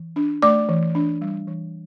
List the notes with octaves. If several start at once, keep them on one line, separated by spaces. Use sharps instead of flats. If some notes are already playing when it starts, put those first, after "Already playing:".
Already playing: E3
D4
A3 D5 D6
E3
D4
G3
E3